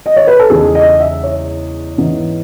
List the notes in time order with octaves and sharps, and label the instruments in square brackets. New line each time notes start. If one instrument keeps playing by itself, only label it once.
[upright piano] D#5
C#5
B4
A4
E2 C#3 G#3 D#4 G#4
D#5
E5
C#5
G#2 E3 B3 D#4